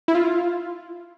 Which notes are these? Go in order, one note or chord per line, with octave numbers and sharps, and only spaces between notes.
E4
F4